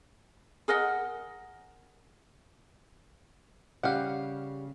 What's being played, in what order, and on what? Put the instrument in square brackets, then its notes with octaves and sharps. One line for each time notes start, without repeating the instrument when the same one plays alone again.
[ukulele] G#4 A#4 D#5 F#5
[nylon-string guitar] C#3 [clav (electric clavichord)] G3 G4 [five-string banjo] F5 F#5